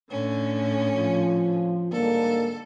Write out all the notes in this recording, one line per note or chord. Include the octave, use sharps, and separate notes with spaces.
A2 D3 C#4
F3
G#2 D3 G3 A#3 A4